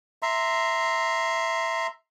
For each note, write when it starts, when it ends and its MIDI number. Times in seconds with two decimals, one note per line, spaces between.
0.23 1.87 76
0.23 1.87 82
0.23 1.87 84